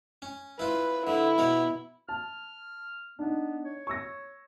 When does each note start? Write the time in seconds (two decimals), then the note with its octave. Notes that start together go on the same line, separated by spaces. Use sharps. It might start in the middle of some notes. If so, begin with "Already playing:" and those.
0.22 C#4
0.59 E4 F4 B4
1.07 D3 E4
1.38 B2 A#4 C#5
2.09 A5 F6
3.19 B3 D4 D#4
3.65 C#5
3.87 C#6 E6 A#6